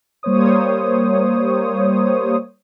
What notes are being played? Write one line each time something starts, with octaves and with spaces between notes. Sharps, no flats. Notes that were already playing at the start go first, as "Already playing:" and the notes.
G3 A#3 C5 C#5 D#6